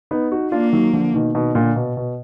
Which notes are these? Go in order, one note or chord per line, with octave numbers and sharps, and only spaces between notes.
B3 D#4
D#4 F#4
A#3 D4 F4
D#3 F#3
D3 F3
B2 D#3
B2 D#3
A#2 D3
B2
B2